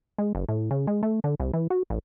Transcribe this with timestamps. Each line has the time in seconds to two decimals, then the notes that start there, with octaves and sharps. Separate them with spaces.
0.18 G#3
0.35 F#1
0.49 A2
0.71 C#3
0.87 G#3
1.03 A3
1.24 D3
1.40 C2
1.53 E3
1.70 F#4
1.90 A1